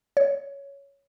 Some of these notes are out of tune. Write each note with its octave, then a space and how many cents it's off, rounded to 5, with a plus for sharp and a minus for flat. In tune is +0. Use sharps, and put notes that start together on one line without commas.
C#5 +5